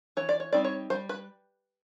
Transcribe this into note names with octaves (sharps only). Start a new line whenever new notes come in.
E3 C#5
D5
C#5
G3 C4 D#4 D5
C#5
G3 C5
B4